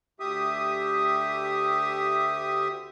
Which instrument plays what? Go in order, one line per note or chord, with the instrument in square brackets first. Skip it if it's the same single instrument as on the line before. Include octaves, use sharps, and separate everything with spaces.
[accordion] D2 G4 E5 D#6